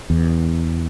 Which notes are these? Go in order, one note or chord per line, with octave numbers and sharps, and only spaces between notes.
E2